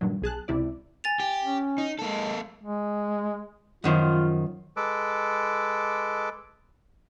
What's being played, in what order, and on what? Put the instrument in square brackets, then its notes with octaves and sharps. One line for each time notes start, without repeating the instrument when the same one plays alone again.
[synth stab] G2 A#2 D#3 F#3
B1 G#4 A5 F#6
C#2 C3 E4 D5
[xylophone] G#5 A6 F7
[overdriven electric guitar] G4
[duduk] C#4
[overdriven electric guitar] D#4
[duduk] G#3 [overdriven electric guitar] A#3 A4
[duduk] G#3
[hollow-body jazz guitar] F#2 D#3 F3 [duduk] F4
[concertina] G#3 A4 B4 D6